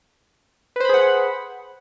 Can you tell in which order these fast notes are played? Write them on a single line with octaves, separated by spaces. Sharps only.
B4 C5 B5 G#4 F#5